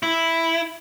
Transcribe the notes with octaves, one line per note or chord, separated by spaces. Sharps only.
E4